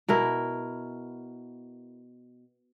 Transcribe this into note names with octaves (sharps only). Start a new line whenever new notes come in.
B2 E4 A#4